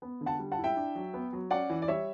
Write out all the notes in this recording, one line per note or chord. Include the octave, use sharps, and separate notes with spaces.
B3
D3
F#5 A5
G3
F#5 A5
E4
E5 G5
D4
F#3
B3
F#3
C#4 D5 F#5
E3
D5
G3 C#5 E5